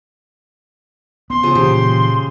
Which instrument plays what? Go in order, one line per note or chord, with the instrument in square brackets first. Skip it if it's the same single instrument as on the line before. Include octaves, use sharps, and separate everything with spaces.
[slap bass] B3 [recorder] C6
[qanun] C#3 F3 G#4
[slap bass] A#2 E3 [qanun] G4